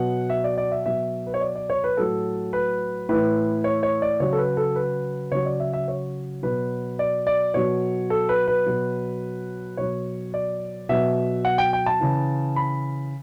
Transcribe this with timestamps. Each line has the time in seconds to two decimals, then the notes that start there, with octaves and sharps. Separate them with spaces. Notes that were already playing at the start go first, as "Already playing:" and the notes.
Already playing: B2 F#3 F#5
0.30 E5
0.44 D5
0.57 D5
0.71 E5
0.86 B2 F#3 E5
1.27 B4
1.34 C#5
1.41 D5
1.55 D5
1.70 C#5
1.84 B4
1.97 A2 F#3 A4
2.53 B4
3.09 A2 E3 B4
3.64 C#5
3.83 C#5
4.02 D5
4.20 C#3 F#3 C#5
4.33 A4
4.38 B4
4.57 A4
4.76 B4
5.32 C#3 F#3 C#5
5.46 D5
5.60 E5
5.73 E5
5.88 C#5
6.43 B2 F#3 B4
6.99 D5
7.27 D5
7.54 B2 F#3 C#5
8.10 A4
8.29 B4
8.48 B4
8.66 B2 F#3
9.77 B2 F#3 C#5
10.34 D5
10.89 B2 F#3 E5
11.45 F#5
11.58 G5
11.73 G5
11.86 A5
12.00 C#3 E3
12.56 B5